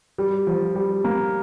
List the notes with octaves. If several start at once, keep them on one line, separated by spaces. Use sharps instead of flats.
G3
F3
G3
A#3